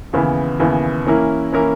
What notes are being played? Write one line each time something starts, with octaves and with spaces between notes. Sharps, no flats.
D#2 C#3 E3 B3 E4
D#2 C#3 E3 B3 E4
E3 A#3 C#4 E4 A#4
E3 A#3 C#4 E4 A#4